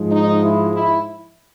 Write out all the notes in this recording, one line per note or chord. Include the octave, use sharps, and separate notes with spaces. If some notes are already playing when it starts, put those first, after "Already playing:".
Already playing: G#2 F3 G#3
D#4
E4
E4